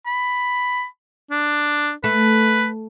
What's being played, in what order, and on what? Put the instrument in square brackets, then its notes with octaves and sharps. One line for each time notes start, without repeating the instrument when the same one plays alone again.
[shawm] B5
D4
[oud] A3 [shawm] B4